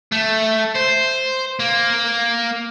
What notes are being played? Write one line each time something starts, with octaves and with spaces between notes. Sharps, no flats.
A3
C5
A#3